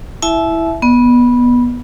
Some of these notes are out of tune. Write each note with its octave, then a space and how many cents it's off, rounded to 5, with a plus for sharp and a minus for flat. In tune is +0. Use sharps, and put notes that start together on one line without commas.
E4 +0 E5 +0 A5 -40
B3 -15 D5 +45